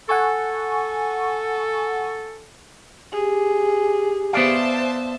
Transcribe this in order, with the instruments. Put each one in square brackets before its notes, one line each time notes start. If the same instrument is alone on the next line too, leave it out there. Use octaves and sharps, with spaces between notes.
[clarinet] A4 [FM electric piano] F#5 G#5 C#6
[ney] G4 [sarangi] G#4
[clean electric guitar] B3 D5 F5 [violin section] C5 E5 A5